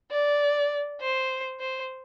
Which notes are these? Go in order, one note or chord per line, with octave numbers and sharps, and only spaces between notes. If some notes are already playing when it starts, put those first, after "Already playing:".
D5
C5
C5